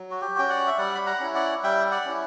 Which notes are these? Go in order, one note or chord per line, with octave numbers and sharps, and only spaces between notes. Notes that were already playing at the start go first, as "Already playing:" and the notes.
Already playing: F#3
F#4
G4
C#4 F#4 G5
D5 F#5
E5
G3 D5 F#5
B5
F#5 A#5
C#4 E4
D5 F#5
G3 E5 G5
D5 F#5
C#4 E4